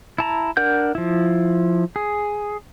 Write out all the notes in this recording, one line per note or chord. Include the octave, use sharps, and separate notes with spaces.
E4 A5 A#5
D4 A#4 F#5 G6
F3 E4
G#4